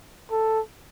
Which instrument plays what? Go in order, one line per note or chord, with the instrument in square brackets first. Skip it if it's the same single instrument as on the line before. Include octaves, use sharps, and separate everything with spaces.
[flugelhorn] A4